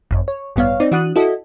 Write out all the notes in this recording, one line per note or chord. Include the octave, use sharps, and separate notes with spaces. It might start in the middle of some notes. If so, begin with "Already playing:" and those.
G#1 F#2
C#5
A1 G2 B3 C#5 F5
C4 D#4 D5
E3 D4 F#4 D#6 F#6 D#7
E4 F#4 A4 D#5